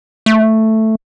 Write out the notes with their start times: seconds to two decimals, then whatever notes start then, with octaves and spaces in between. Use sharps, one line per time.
0.26 A3